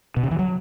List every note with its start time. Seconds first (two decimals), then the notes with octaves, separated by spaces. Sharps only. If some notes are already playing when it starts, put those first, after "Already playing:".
0.17 B2
0.23 C#3
0.31 E3
0.39 F#3